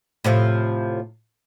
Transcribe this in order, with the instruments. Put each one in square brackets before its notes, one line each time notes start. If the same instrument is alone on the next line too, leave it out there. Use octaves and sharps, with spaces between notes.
[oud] A2 C3 F3